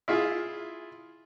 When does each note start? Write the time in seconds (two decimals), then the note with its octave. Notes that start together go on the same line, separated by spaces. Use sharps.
0.08 E4 F4 G#4 E5